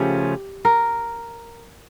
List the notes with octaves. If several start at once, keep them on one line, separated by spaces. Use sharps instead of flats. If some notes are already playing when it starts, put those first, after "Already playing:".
Already playing: C#3 F3 A3 C#4 G4
A#4